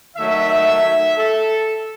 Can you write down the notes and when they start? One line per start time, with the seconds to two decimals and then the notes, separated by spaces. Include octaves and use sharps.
0.16 D#3 F#3 A3 D#4 E5
1.17 A4